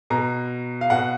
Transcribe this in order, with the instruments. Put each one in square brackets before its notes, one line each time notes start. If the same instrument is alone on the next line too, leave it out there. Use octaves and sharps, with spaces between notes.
[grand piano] B2 A#5
F5
B2 F#5